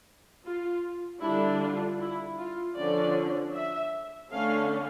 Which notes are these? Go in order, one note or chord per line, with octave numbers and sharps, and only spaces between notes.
F4
D3 G3 D4 E4
F4
E4
F4
D3 F3 C#4 D5
E5
D3 A3 C#4 F5